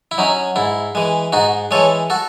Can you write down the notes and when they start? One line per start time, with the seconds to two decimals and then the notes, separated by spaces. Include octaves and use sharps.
0.11 E4
0.18 F#3 C#4 D#4
0.56 G#2 E4
0.95 E3 G#3
1.32 G#2 D#4 F#4
1.71 E3 G#3 A4 C#5
2.10 F#4 A4